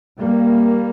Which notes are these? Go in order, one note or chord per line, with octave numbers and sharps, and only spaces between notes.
G3 A#3